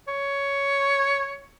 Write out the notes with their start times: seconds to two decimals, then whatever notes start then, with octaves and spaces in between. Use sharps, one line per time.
0.08 C#5